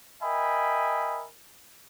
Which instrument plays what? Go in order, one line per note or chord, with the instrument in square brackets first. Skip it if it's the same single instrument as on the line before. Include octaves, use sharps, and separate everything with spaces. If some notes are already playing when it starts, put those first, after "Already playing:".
[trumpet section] A#4 D#5 E5 G5 G#5 B5